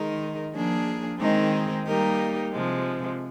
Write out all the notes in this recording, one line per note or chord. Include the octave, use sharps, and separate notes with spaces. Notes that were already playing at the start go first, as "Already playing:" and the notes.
Already playing: D#3 G#3 D#4 A#4
F3 A#3 D4 G#4
D#3 G#3 C4 D#4 G#4
G3 A#3 D#4 G4 A#4
C3 F3 G#3